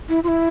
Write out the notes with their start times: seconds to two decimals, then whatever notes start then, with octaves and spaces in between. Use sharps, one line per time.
0.09 E4
0.24 F4
0.28 E4